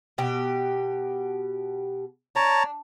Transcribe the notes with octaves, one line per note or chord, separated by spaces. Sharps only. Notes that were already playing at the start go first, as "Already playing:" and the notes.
B2 G4
D4 C#5 A5 A#5